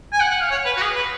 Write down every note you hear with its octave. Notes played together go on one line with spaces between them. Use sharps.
G#5
F#5
F#5
F5
C#5
B4
F#4
G#4
B4